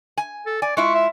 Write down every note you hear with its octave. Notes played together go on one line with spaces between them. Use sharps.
G#5
A4
D5 G#5
G#3 E4 F4 C#6
E5